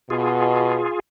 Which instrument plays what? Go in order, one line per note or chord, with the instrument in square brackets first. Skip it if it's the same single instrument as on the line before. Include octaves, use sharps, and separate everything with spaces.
[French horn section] B2 [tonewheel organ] F4 G#4